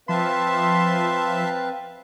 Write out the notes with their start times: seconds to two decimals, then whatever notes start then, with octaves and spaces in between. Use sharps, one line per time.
0.09 F3 C4 B4 E5 F5 A5 C6